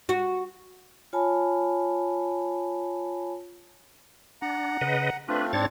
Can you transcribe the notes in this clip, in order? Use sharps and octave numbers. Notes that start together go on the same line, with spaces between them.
F#4
F4 C#5 G#5 A5 B5
D4 F#5 A#5
C#3 B4 D#5
A3 C4 D4 F4 B4
G#2 C4 D4 C#5 A6